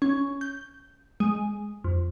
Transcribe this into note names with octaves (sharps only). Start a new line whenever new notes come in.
C#4
G6
G#3
F2